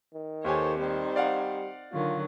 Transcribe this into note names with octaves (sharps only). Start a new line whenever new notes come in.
D#3
D#2 G4 A4 C5 C#5 G#5
D#3 G3 C4 C5
D5 F5 F#5
D3 D#3 F#3 F4